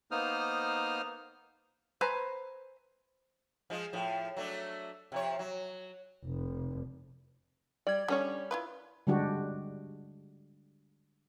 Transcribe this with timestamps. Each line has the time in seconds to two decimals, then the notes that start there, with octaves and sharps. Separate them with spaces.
0.11 A#3 B3 D#4 C5 D#6 F6
2.01 B4 C5 G#5 A#5
3.70 F3 G#3 F4
3.93 A2 F3
4.37 F#3 A3 D4
5.12 C3 F3 C#5
5.39 F#3
6.25 F1
7.87 G3 D5 G#6
8.08 D3 G3 C#4 C#5
8.51 E4 F4 B4
9.07 D3 G3 G#3 D4 F#4 G4